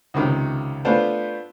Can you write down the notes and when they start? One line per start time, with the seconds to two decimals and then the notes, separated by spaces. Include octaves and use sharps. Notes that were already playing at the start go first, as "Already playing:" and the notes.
0.14 C#2 C3 D#3
0.85 A3 B3 D4 F4 B4 C5